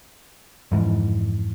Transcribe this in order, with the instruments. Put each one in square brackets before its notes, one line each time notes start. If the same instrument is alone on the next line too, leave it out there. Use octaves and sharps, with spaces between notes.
[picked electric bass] F2 G#2 E3